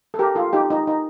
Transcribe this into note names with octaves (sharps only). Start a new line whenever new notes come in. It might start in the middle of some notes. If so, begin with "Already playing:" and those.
A4
G4 A#4
F4 A4
D#4 G4
D#4
D#4